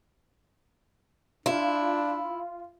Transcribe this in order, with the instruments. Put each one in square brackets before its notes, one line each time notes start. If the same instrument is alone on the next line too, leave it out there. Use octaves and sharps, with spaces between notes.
[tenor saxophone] D4 [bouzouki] E4 [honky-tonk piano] F4